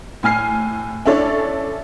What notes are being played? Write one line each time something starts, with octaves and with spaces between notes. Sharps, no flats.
A2 G#5 F6 C7
C#4 D4 E4 A4 C#5 D5